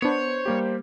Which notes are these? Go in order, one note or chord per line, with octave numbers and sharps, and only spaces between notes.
B3 D4 C5 C#5 C#7
G3 A#3 G4